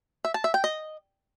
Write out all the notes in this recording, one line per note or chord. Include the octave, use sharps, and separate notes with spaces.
E5
A5
E5
G5
D#5